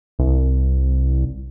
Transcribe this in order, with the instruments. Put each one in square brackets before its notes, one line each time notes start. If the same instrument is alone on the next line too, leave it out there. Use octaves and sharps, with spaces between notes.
[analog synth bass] C2